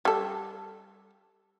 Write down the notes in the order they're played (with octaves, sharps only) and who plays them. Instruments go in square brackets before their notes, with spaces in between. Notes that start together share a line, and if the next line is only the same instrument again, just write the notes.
[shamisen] G3 A4